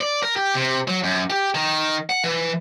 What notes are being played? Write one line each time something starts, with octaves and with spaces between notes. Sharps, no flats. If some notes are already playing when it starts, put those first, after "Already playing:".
D5
A#4
G4
C3
F#3
F#2
G4
D#3
F#5
E3